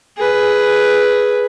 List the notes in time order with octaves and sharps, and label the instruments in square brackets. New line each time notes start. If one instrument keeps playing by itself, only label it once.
[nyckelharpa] G#4 B4